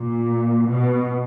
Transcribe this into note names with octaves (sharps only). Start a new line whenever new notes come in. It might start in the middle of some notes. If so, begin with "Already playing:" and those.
Already playing: A#2
B2